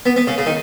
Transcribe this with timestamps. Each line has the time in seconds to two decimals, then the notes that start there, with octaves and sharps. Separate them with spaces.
0.06 B3
0.16 B3
0.27 C#3
0.38 C#3
0.46 D#3